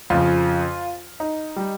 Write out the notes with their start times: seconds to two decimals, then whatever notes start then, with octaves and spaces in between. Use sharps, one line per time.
0.10 F2 C#3 F3 F4
1.20 D#4
1.56 G3